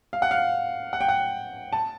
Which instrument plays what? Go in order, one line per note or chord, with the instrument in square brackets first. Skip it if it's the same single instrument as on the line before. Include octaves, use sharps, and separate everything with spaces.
[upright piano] F5
F#5
F5
F#5
G5
F#5
A5